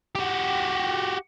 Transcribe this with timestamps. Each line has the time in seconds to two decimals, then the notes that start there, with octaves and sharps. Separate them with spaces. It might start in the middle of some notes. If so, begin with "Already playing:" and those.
0.15 F#4 G4